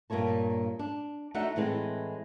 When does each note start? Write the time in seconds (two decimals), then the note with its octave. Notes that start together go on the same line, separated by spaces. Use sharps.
0.10 G2 A#2 A#3 C#5 A5
0.79 D4
1.34 A3 D4 D#4 F#4 E5 F#5
1.56 A2 E3 G#3 C4 B4